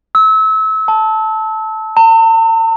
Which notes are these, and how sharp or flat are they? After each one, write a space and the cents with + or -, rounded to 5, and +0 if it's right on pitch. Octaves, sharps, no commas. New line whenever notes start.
E6 -30
A5 -5
A5 +45